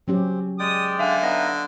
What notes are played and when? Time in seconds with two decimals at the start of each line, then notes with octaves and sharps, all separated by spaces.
0.08 F#3 C4 C#4 G4
0.59 G#3 D5 G5 D#6
0.99 D3 E5 F5 G#5
1.22 B3 D#4 D#5